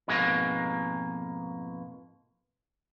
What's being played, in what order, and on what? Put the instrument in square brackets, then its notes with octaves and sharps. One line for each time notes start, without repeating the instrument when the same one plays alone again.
[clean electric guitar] F2 G#2 B2 G#3 A#3